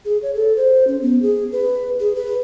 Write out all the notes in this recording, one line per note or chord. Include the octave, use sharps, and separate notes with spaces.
G#4
C#5
A4
C5
C#4
B3
G#4
B4
G#4
B4